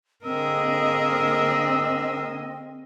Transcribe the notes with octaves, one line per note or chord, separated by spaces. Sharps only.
D3 A#3 C4 G#4 A#4 D#5 E6